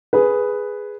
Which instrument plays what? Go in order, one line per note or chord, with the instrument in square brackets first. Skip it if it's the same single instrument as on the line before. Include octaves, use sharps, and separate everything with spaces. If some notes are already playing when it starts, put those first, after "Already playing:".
[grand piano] G#4 B4